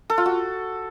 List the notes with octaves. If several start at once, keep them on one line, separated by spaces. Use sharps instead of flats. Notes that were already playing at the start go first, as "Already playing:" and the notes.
A4
F4
F#4